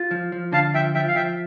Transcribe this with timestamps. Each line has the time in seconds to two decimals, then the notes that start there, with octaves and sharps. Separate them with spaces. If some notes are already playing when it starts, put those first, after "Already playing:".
Already playing: F4
0.11 F3
0.32 F3
0.53 D3 F5 A5
0.74 F3 E5 G5
0.95 F3 E5 G5
1.08 F5
1.15 F3 E5 G5